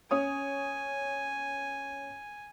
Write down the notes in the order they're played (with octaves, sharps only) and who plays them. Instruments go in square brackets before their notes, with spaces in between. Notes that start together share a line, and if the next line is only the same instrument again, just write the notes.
[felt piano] C#4 C#5 D#6 [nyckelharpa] G#5